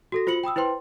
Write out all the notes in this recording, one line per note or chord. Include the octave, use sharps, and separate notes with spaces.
F#4 A4 A#6
F4 C5 B5 C#7 F#7
G5 B5 D#6 E6
E4 B4 C5 G5 C6